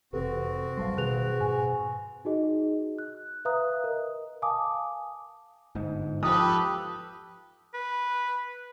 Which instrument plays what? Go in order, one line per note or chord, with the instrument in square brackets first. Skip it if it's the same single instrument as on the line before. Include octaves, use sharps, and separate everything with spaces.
[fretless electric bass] F1 C3 E3 [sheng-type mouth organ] C4 F#4 [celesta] G4 A4 B4
[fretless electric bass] A1 F#3 G3 [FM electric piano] F5 A5 C6
[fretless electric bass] B2 D#3 [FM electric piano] G#4 B4 [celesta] F#6 F7
[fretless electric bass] G#2 B2 [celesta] G#5
[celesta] D#4 F#4 G#4 D#5
F#6
B4 E5 F5 A#5 D#6 F#6
A#4 D#5
F5 G#5 A5 D6 D#6
[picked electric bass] G1 G#2
[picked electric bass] F3 [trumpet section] G4 A4 B4 [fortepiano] D#6
[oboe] B4